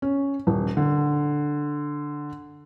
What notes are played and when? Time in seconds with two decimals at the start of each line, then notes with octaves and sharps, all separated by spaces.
0.02 C#4
0.47 D#1
0.77 D3